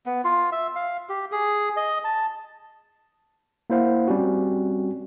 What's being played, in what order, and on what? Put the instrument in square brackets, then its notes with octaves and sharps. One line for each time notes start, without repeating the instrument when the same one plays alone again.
[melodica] B3
F4
E5
F5
G4
G#4
D#5
A5
[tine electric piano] A#3 E4 C5 F5 F#5
G3 C4 C#4 F#4